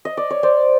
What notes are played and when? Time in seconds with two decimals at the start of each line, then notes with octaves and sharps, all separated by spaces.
0.05 D#5
0.17 D5
0.30 C#5
0.43 C5 D5